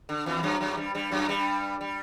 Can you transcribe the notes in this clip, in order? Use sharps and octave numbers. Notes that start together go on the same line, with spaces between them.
D3
E2 E3
F#2 F#3
F#2 F#3
G2 G3
G2 G3
F#2 F#3
G2 G3
G3